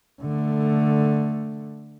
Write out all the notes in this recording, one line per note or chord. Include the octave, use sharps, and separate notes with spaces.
D3 A3